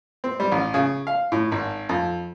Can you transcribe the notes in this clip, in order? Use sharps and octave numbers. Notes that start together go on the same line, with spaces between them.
C4
G3
A1
C#3
F5
A2
G#1
F2